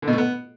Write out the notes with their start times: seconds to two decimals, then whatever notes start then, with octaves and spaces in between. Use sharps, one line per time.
0.02 D3
0.08 B2
0.13 A3
0.18 B3